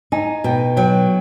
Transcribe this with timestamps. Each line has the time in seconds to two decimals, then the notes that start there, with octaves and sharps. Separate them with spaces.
0.12 D#4 G#5
0.44 B2 G5
0.76 F#3 G5